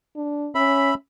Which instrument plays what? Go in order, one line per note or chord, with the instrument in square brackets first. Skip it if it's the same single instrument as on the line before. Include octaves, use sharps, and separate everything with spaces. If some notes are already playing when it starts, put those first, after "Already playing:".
[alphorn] D4
[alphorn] C#4 [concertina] E5 B5